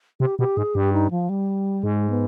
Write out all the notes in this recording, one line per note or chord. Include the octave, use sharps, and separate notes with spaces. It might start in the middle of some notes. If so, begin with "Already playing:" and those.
C3 G4
B2 G4
G#2 G#4
G2 G4
D#4
F3
G3
G#2 G#3
B3